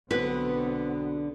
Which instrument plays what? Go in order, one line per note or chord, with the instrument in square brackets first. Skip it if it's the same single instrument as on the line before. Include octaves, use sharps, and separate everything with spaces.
[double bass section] B1 B3 C4 [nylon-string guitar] D3 [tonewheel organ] F#4 [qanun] B4